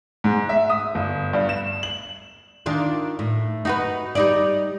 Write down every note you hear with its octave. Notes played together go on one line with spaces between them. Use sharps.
G#2
E5
D#6
G1
G2
E7
F#7
D#3 D4 F4
A2
D#4 F#4 B4
G3 D#4 D5